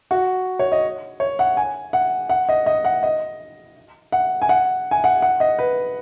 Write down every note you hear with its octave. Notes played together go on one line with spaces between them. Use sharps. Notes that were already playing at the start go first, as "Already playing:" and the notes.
F#4
C#5
D#5
C#5
F#5
G#5
F#5
F#5
D#5
D#5
F#5
D#5
F#5
G#5
F#5
G#5
F#5
F#5
D#5
B4